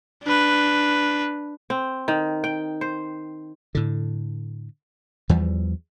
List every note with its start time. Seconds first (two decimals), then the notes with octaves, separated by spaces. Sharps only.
0.23 D4 B4
1.70 C4
2.08 D#3
2.44 G5
2.81 C5
3.75 A2 D3
5.29 E2 E3 F3 G3